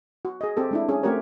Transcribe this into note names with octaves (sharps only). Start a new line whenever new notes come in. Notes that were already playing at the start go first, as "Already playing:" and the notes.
F#4
G#4 D#5
C4 G4 A4
G#3 D4 E4
C#4 G#4
A3 C4 F#4 G4 A#4 C#5